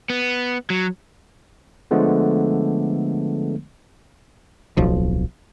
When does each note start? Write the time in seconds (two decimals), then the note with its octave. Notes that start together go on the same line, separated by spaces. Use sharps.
0.10 B3
0.70 F#3
1.91 D3 F3 G#3 A3 B3
4.77 D1 B1 F3